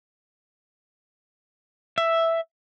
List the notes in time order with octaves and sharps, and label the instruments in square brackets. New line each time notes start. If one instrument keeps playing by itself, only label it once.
[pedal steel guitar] E5